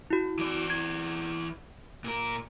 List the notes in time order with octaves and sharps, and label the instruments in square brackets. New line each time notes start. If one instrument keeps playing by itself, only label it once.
[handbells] E4 F#4
[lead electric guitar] E3 D5
[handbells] G#6
[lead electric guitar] A#2 A#4